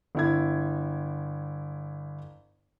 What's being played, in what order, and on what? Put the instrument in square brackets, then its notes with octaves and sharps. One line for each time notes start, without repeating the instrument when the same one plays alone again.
[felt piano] G1 E4 G#6